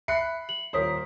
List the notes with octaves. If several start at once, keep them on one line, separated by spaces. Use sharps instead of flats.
E5 B5 F#6 C7 C#7
F#7
D#1 A#4 C5 C#5 D#6 B6